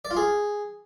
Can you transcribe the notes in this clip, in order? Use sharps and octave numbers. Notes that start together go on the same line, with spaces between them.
D5
F4
G#4